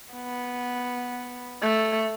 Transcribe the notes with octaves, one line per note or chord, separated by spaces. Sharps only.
B3
A3